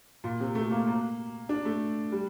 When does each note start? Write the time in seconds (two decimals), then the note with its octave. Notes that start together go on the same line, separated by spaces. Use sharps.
0.24 A#2
0.40 C3
0.55 A3
0.71 A#3
0.87 A#3
1.49 D4
1.65 A3
2.12 G3